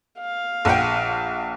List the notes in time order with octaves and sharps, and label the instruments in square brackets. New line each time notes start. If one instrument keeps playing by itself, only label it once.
[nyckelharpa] F5
[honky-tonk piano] A#1 F#5 G5